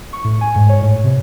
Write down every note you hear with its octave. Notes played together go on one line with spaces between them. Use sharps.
C#6
A2
G#5
G#2
C#5
A2
C3